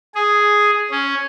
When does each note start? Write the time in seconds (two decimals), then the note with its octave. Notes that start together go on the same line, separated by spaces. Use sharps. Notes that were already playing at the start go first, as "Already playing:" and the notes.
0.15 G#4
0.91 C#4